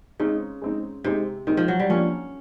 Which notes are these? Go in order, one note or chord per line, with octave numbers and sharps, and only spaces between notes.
C#3 G#3 C4 D#4
G#3 C4 D#4
C3 G#3 C4 D#4
D#3 G#3 C4 D#4
F3
F#3
G3
F3 A#3 C#4 D4